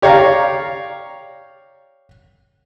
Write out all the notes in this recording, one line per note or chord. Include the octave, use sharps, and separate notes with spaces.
G4 C#5 D5 F5 A#5